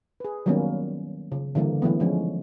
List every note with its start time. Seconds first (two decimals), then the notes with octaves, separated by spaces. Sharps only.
0.20 G#4 B4
0.46 D#3 F#3 G3 A#3 B3 C#4
1.32 C#3
1.55 D3 E3 G3 A#3 D4
1.82 E3 F#3 A3 B3
2.00 F3 G#3 C#4